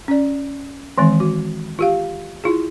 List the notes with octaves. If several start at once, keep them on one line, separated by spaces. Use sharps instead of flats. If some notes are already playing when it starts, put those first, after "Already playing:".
C#4 D5
D#3 E3 G#3 C4
F#4
F4 G4 F5
E4 F4 G#4